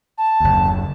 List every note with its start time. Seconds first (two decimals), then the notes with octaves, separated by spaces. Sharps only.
0.18 A5
0.40 F#1 D#2